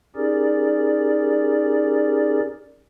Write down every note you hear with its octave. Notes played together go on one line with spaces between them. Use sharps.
C#4 D#4 G4 G#4 A#4 D5